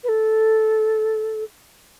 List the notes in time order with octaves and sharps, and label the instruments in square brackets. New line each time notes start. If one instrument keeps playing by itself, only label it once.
[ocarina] B4
A4